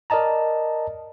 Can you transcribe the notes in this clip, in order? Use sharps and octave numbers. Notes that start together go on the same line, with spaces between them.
A#4 D5 D#5 A5 A#5